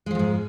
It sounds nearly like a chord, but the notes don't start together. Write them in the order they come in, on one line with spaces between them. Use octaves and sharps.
G#3 F3 F2 G#2